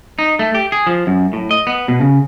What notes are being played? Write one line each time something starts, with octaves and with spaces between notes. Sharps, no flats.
D#4
A3
G4
G#4
F3
F#2
A2
D#5
B3
B2
C#3